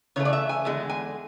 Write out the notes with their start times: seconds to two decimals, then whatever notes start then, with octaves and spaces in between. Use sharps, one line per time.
0.16 C#3 E3 A3 C#5
0.25 D5
0.33 E5
0.49 G#5
0.65 E2 D3 G#3
0.90 G#5